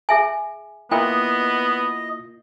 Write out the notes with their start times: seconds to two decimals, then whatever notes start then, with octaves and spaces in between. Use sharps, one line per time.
0.09 G#4 E5 G#5
0.91 A#3 B3 E4 F4 D#5 G5